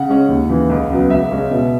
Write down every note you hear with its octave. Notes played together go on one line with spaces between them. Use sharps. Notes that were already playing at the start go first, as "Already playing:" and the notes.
Already playing: C#3 F#5
G#3 C#4
D#2
C#3 E3
C#2
C#3 F#3 B3
C#2 E5
C#3 G#3 C#4
B2